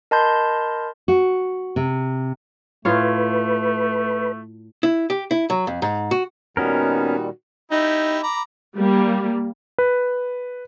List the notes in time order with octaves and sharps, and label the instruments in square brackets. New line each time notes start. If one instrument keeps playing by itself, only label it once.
[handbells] A#4 D#5 A5 B5 C6 G6
[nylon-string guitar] F#4
C3
[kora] A2 F4 C#5 [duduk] A3 [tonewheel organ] B4
[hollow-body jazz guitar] E4
G4
E4
F#3
F2
G#2
F#4
[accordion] A#2 D#3 G3 [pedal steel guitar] B3 C#4 A#4 [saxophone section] D#4 F#4
[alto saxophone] D#4 [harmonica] E4 G4
[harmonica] A#5 B5 D6
[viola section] G3 A#3
[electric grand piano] B4